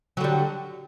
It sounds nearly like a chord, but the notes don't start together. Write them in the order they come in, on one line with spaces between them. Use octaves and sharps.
F#3 D3 G3